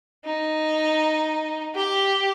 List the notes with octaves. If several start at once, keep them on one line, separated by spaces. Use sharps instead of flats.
D#4
G4